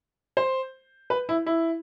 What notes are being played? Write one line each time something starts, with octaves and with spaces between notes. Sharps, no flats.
C5
B4
E4
E4